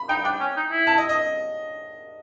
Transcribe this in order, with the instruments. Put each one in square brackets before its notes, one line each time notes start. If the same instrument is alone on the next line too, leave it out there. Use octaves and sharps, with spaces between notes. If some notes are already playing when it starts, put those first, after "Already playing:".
Already playing: [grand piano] B5
[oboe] D#4 [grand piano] G5
[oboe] D4 [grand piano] G5
[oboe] C#4
D#4
E4
[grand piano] A5
D#5
D#5